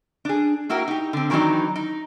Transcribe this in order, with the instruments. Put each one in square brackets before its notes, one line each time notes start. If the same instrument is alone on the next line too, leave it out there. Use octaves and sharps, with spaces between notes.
[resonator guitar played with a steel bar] D4 G#4
A#3 E4 F#4 G4 A#4
D#4 G4
D3 C4
D#3 E3 F#3 C4 D4 D#4
D#4